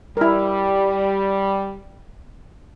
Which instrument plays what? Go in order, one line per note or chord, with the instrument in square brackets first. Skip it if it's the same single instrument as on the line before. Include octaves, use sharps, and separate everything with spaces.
[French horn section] G3 [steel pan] E4 A#4